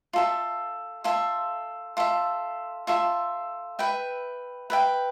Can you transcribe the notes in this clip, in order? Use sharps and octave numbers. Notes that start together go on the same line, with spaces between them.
F4 A4 E5
F4 A4 E5
F4 A4 E5
F4 A4 E5
B4 E5 G5
B4 E5 G5